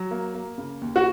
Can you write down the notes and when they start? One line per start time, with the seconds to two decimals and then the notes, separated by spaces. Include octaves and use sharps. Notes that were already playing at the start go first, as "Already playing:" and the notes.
Already playing: F#3
0.11 A#3
0.35 A#3
0.58 C#3
0.82 D#2
0.96 F#4